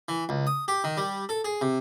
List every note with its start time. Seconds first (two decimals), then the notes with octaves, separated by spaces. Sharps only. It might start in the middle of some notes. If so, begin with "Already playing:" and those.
0.08 E3
0.29 C#2
0.47 D#6
0.68 G4
0.84 D#3
0.97 G3
1.29 A4
1.45 G#4
1.61 C3